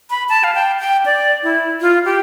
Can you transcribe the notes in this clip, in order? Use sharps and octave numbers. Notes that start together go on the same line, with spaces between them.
B5
A5
F5
G5
G5
D5
E4
F4
G4